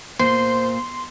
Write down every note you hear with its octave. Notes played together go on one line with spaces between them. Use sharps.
A#2 C5 C6